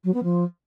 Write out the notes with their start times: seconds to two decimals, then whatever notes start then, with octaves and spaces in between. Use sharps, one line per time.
0.04 F#3
0.14 B3
0.23 F3